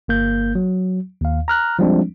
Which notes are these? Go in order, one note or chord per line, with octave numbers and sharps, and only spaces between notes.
G1 A#3 G6
F#3
D#2 F5
A#5 F6 F#6
F3 G3 G#3 C4 D4